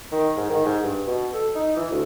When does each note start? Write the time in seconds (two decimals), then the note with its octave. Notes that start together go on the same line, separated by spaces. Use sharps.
0.12 D#3
0.37 G#2
0.50 D#3
0.66 G#2
0.84 G2
1.07 B2
1.34 A4
1.56 D#4
1.76 E3
1.91 D2